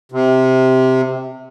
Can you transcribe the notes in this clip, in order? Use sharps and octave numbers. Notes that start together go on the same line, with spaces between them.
C3